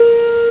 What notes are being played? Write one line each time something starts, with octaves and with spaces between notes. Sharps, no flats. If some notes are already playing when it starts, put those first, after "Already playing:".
Already playing: A#4